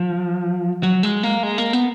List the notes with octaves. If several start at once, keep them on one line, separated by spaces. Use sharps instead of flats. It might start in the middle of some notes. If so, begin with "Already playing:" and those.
Already playing: F3
F#3
G#3
A#3
G#3
A#3
B3